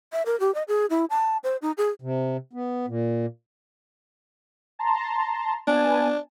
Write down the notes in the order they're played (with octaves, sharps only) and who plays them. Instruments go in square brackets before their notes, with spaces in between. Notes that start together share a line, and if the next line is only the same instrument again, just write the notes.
[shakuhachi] E5
A#4
G4
D#5
G#4
E4
A5
C5
D#4
G#4
[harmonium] C3
B3
A#2
[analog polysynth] A5 A#5 C6
[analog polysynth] B3 G#5 A5 [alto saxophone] D4